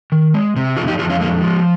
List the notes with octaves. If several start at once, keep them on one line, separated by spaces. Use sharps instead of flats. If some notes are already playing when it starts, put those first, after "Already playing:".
D#3
G#3
C3
F2 F4 G#4
D#4 G4
F2 F4 G#4
C#4 F4
G#3 A#3
F3